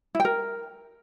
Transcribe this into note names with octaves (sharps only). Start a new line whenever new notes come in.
E4
G5
A#4